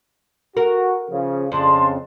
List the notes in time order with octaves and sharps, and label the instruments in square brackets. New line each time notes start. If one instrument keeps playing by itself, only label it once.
[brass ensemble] F#4 [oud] A#4
[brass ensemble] C#3 F3
[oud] F2 D4 [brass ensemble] C#3 [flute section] A5 C6